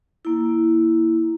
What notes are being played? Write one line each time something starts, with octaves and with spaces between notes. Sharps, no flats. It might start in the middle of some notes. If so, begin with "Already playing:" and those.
A#3 E4